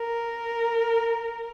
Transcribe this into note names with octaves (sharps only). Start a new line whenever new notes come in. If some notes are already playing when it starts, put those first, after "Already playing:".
Already playing: A#4